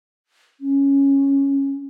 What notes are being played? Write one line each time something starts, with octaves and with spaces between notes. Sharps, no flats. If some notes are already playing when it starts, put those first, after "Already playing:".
C#4